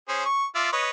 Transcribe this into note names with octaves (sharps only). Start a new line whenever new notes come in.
C#4 G#4 C5
C#6
F4 D5 E5
B4 C#5 D#5